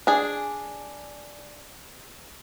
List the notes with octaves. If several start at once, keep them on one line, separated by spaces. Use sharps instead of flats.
D4 G#4